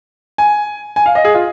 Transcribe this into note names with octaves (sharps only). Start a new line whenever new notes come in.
G#5
G#5
F5
D#5
G#4
F4